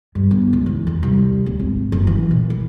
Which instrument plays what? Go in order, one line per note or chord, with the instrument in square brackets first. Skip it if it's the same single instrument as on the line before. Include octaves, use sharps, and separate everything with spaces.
[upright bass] G2
G1
C#2
E3
E2
C2
D1
G#1
F#1
E3
A#2
E3